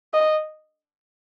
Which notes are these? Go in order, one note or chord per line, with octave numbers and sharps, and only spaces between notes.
D#5